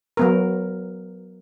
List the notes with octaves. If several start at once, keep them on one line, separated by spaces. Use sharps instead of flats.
F#3 B3 A#4